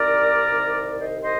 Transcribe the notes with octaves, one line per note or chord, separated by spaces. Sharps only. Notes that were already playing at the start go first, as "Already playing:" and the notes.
Already playing: C2 C3 D#3 A#4 D5
C2 C3 D#3
C5 D#5
C5 D#5